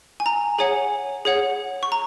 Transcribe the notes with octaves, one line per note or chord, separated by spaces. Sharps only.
G#5
A#5
G#4 C#5 F#5 G#5
G#4 C#5 F#5
C#6
A#5